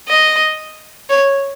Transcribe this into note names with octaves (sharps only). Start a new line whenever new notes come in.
D#5
C#5